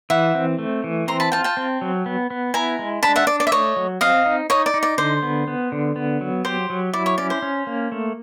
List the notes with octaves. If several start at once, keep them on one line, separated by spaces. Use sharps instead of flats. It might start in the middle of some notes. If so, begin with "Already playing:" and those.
E3 E5 F#5
C4
A3
E3
C4 A#5 C6
A5 B5
F4 G5 A5
G5 A5
C4
F#3
B3
B3
E4 G#5 A#5
G#3
D4 A5 B5
E5 F#5
D4 D5
D5
E5
A3 C#5 D#5
F#3
C4 D#5 F5
D#4
D#4 C#5 D#5
D5
D#4
D5
D3 C5
B3
B3
D3
B3
F#3
G4 C5
F#3
E4 D5
C#5
C#4 D5
C5
C#4
A#3
A3